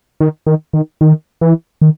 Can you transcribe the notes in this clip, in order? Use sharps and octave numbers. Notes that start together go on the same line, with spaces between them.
D#3
D#3
D#3
D#3
E3
D#3